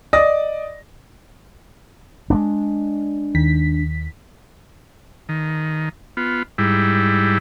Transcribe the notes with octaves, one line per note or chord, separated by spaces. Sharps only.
D5 D#5 D#6 A#6
G#3 B3 D4
D#2 D#3 B6
D#3
B3 F4
G#2 G3 E4